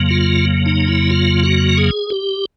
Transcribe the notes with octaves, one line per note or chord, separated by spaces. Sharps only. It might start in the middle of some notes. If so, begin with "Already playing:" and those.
Already playing: F2 C#3 F#3 A#3
F4
D#4
E4
F4
F#4
G#4
G4